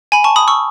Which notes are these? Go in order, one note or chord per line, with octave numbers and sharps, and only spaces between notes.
G#5 B5
A5 C#6
B5 D#6
C#6 E6